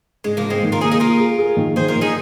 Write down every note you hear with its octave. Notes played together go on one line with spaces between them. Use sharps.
G#2 G#3
F3 A#3
G#2
G#3 C4
D#3
F4 A#4
A#3 D#4 G#4
D#4 G#4
A#3 F4 A#4
G#4
G#4
D#3
D#3 G#4 C5
F4 A#4
D#3
D#4 G#4